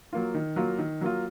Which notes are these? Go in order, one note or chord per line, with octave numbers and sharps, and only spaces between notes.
F#3 A#3 F4
D#3
F#3 A#3 F4
D#3
F#3 A#3 F4